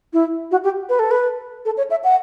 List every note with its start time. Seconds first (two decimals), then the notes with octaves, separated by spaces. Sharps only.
0.13 E4
0.51 F#4
0.64 G4
0.89 B4
0.99 A4
1.11 B4
1.65 A4
1.77 C#5
1.91 E5
2.04 F#5